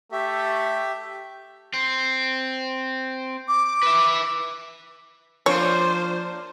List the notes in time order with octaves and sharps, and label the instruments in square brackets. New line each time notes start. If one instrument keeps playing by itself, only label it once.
[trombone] A3 [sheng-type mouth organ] G4 E5
[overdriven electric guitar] C4
[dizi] D6
[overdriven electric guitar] B4 E5
[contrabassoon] F3 [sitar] A#3 D4 F4 [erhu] C5 [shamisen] C#5